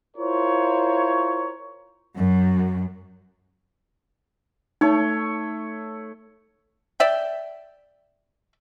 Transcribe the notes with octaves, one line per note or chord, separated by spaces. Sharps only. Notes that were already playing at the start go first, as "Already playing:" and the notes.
E4 F4 A#4 C5 C#5
F#2
A3 D#4 C#5
D5 E5 G5